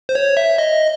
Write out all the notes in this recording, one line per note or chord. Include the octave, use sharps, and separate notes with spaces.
C5
C#5
E5
D#5